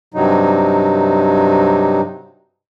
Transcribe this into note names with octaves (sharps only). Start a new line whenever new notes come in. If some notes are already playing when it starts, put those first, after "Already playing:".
G2 C3 F#3 D#4